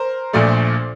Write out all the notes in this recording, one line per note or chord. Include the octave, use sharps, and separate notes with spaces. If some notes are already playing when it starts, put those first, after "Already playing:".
Already playing: A#4 C5
A#1 A#2 F3 A3 C5 D5